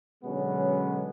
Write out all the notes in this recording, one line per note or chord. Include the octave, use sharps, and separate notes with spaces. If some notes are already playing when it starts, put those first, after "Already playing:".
B2 D3 F#3 G#3 B3 C#4